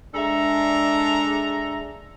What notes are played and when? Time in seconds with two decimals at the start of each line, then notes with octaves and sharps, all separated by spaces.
0.15 G#3 D4 A4 E5 A#5